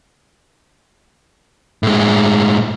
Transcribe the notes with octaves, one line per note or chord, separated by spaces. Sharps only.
A2 G#3